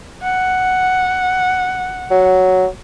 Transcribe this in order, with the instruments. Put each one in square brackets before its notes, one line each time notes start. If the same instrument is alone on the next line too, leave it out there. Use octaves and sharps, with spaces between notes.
[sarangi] F#5
[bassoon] F#3